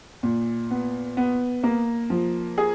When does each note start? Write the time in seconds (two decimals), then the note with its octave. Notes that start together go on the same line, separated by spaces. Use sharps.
0.23 A#2
0.71 B3
1.17 B3
1.63 A#3
2.10 F3
2.58 G#4